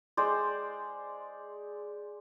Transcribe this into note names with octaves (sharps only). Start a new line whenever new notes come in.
G#3 C5 D5